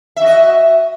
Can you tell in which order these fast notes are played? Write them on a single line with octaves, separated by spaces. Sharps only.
E5 F#4 D#5